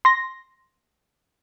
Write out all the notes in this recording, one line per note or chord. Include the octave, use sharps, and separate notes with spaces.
C6 A#6